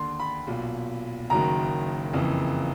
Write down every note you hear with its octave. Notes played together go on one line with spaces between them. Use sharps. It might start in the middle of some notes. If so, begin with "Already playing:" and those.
Already playing: D#2 D3 C6
B5
B1 A#2
F#1 F#2 D#3 A#5
F#1 F2 C#3 E3